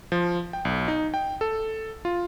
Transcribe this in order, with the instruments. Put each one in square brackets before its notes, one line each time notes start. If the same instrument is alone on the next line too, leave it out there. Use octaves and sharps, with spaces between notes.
[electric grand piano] F3
G5
B1
D#4
G5
A4
F4